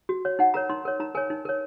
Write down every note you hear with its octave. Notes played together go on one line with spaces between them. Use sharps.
F#4
C#5
D#4 F#5
A#4 C#5 A#5
D#4 C6
A#4 C#5
D#4 A#5
A#4 C#5 G#5
D#4
A#4 C#5